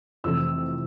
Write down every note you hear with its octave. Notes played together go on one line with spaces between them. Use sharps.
F1 F2 C3 E3 A3 E6